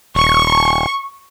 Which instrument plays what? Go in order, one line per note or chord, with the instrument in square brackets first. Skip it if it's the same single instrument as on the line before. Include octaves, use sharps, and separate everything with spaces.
[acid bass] D#1 [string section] C#6